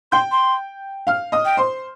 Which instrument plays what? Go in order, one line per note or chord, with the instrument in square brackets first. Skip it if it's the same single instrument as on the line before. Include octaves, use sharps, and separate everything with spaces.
[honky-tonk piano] G5 G6 [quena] C6
[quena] C6
[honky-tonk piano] F5 F6
D#5 D#6
[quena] G5
[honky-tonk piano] C5 C6